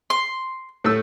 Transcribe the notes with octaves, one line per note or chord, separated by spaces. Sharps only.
C6
A2 A3 E6